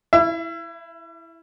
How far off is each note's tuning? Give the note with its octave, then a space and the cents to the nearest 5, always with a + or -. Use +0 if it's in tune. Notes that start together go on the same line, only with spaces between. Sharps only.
E4 +0 E5 +40